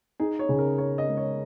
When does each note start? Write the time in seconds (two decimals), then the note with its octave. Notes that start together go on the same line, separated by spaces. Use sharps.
0.20 D#4 G#4
0.39 C#5
0.49 C#3 G#4
0.59 A#4
0.78 A#4 C#5
0.98 D#5
1.07 G#3
1.17 C#5